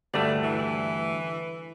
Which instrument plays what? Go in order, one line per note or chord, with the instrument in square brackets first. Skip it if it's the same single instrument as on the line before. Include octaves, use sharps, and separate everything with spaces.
[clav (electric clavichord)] D2 G2 A3 [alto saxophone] D5
[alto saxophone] E3